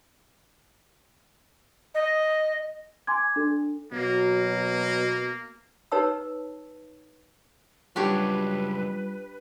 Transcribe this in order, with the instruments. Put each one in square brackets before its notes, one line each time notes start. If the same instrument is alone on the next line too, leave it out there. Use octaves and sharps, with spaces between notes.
[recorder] D#5
[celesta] G#5 C6 D6 G#6
D4 A4
[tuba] B2 [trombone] F#3 [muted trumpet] A#3
[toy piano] D#4 B4 C#5 A5 E6
[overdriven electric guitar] C#2 F#2 [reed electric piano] G3 F4 [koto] D4 G4 C#5 [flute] B4